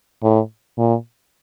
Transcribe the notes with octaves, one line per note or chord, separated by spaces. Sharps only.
A2
A#2